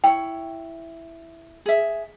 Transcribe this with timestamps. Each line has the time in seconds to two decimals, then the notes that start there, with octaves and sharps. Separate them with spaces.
0.04 E4 C#5 G5
1.66 G#4 E5